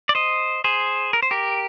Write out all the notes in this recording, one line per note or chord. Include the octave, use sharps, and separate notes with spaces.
D5
C5 D#5
G#4 C5
A#4
C5
G4 A#4